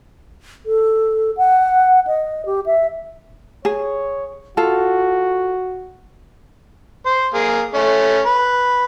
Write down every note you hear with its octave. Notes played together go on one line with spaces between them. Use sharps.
A4
F#5
D#5
G4
E5
G#4 C#5
F4 F#4 A4
C5
A#3 G#4
A3 C#4
B4